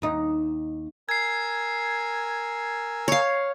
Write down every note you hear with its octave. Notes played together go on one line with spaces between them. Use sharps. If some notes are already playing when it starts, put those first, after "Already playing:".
D#2 D#4
A#4 G#5 E6 G#6 C7
C#5 F5